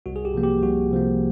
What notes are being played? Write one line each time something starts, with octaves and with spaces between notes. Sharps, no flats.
C2 F#4
G#4
G4
C3 F3 A#3
G4
C2 F#4
C3 F3 A#3